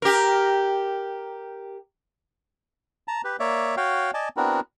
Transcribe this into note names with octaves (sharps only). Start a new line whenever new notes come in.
G4 A#4
A5 A#5
G4 B4
A#3 C#5 D5 E5
F#4 C#5 F5 G5
D5 D#5 G#5 A5
B3 C4 D4 E4 F#4 A#4